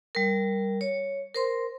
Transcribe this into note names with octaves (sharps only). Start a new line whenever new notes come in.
G3 A#4
C#5
A#4 C5 C6